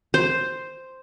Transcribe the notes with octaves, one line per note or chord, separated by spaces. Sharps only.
C5